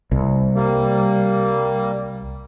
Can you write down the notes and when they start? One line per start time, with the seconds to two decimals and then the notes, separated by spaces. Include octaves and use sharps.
0.12 C2
0.55 G3 A#3